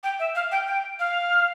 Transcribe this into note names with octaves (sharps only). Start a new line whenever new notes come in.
G5
E5
F5
G5
G5
F5